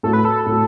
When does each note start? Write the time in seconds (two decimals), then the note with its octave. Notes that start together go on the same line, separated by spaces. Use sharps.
0.03 A2 A3 F#4 A4
0.13 B4
0.25 A4
0.46 A2 A3 F#4